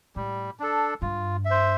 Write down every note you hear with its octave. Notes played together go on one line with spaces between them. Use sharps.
A2 G3
D4 A4
G2 F4
E5
C5